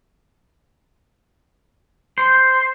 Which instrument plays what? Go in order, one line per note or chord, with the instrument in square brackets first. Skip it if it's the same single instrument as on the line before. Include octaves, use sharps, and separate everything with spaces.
[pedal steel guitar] C5